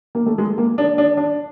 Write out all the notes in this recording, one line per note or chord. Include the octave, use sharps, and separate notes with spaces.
A#3
A3
G#3
A#3
D4
D4
D4